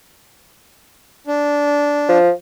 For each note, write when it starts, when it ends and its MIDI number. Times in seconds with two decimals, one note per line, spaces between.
1.27 2.18 62
2.09 2.32 53